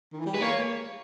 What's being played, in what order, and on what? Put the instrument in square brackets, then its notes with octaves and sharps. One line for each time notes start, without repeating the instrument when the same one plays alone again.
[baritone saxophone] D#3
E3
G3
[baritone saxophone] G#3 [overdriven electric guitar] B4
[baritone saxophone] A#3 [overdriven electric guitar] C#5